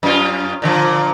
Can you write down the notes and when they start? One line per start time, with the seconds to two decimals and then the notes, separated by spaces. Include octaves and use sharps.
0.03 F#2 C#4 F4
0.62 A#2 D3 F3